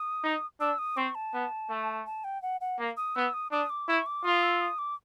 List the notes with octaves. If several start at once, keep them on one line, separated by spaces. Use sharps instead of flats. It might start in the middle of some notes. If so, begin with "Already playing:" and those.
Already playing: D#6
D#4
D4 E6
D#6
C4 C#6
A5
B3
A3
A5
G5
F#5
F#5
A#3
D#6
B3 E6
D#6
D4 D#6
D6
E4 C#6
D6
F4 D#6
E6
D#6
D6